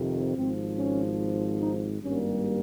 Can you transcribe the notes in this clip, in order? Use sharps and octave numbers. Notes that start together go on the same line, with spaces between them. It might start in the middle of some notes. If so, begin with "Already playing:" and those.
Already playing: F2 C3 D#3
G#1 G#2 F3 C4
C#4
D#4
G#1 G2 G3 A#3 C#4